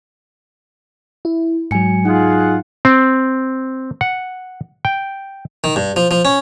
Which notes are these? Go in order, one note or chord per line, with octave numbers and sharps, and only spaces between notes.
E4
G#2 F#3 G#5 C#7
D#4 F4 G#4 F#5
C4
F#5
G5
D#3
G2
F3
F3
C#4